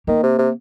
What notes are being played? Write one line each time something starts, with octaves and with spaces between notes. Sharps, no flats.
D#3 A#3
C3
C3